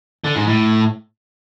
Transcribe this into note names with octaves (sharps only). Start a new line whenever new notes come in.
D3
G#2
A2